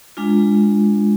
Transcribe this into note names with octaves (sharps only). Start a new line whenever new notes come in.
G#3 D4 F4